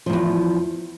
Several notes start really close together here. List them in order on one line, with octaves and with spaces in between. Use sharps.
F3 G#2 E2